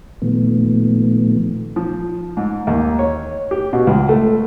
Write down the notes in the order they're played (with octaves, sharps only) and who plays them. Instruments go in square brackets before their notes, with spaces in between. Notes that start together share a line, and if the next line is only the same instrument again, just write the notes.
[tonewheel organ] A#2 D#3 F3 A3 B3
[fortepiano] F3
G#2
D#2
C#5
G4
B2
C#2
A3